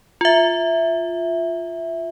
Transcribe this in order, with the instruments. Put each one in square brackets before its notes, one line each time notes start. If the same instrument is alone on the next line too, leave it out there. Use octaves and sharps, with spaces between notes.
[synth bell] F4 E5